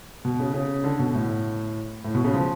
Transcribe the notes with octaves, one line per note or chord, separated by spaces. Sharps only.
B2
C#3
C#3
D3
B2
A2
A2
B2
C#3
F3